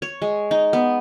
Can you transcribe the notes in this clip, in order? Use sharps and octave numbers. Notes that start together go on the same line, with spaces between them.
C#5
G#3
D#4
B3